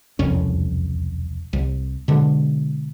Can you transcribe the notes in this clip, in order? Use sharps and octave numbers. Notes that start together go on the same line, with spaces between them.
E1 C2 F2 C#4
C2
B2 D3 G#3